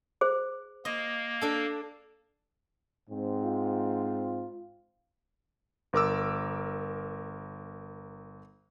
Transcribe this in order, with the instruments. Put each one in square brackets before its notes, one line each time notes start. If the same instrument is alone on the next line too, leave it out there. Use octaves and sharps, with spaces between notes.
[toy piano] G#4 C5
[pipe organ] A#3 [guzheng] D#5
[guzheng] D4 A4
[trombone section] G#2 C4
[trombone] F4
[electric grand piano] G1 A#4 D6 E6